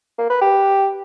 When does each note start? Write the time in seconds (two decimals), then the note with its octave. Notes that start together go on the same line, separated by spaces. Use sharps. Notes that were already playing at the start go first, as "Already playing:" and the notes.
0.18 A#3
0.30 B4
0.41 G4